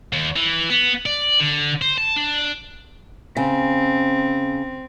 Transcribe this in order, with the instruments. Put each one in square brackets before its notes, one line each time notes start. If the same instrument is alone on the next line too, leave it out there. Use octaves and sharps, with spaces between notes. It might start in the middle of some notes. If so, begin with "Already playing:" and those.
[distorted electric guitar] D#2
E3
B3
D5
D3
C5
A5
D4
[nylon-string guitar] C#3 [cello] C4